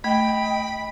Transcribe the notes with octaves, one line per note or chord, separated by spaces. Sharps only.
A3 D#5 G5 B5